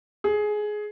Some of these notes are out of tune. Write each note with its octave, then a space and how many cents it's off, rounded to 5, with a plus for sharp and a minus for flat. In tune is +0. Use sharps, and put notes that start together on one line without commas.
G#4 +15